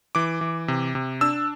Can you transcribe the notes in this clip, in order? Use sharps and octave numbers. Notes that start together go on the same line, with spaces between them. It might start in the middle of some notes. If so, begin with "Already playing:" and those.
E3 D6
E3
C3
C3
D4 E6